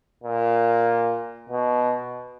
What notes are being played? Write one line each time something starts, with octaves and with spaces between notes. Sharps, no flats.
A#2
B2